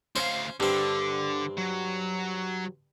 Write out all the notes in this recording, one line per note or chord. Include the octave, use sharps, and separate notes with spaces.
D2 C#4 C5 F5
G2 D3 C4
F#3